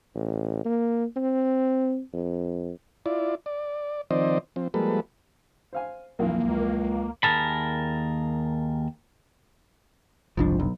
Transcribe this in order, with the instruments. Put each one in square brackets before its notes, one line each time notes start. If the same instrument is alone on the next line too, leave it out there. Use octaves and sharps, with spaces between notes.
[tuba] A1
A#3
C4
F2
[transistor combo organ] E4 F4 D5
D5
D#3 F3 C4 C5 D5 D#5
F3 C4
F3 G3 G#3 A#3 A4 B4
[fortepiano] C5 F5 G#5
[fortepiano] B1 F2 E3 [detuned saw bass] A#3
[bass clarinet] C#2
[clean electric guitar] D#2 G#3 G#4 A#4 A5 B5
[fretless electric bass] F#1 C2 D4 [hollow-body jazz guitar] F2 G#2 F3
[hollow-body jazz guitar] B1